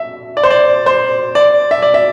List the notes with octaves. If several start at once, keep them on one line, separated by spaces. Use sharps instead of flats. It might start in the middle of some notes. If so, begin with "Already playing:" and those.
Already playing: E5
D5
C5
D5
C5
D5
E5
D5
E5